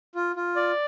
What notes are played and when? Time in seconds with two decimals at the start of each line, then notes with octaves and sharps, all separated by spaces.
0.15 F4
0.36 F4
0.56 D5